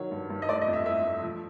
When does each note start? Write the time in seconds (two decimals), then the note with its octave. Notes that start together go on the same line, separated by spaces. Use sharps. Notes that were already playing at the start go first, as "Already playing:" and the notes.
Already playing: D#3 F#3 C#5
0.11 G2
0.30 G2
0.42 D#5
0.49 A3 D5
0.62 D#5
0.67 F2
0.73 E5
0.86 A3 E5
1.03 A3
1.22 F3